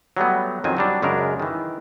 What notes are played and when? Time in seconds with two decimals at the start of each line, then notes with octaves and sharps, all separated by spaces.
0.17 F#3 G3 A3 B3
0.64 F2 D#3 F#3 C4 G#5
0.77 F#3 G3 D4
1.02 F#2 C#3 G#3 D4 A#4
1.40 D#3 E3